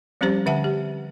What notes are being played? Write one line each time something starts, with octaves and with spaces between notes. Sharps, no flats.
F3 G3 C4 C#4 G4 C5
D3 E5 F#5 A5
G4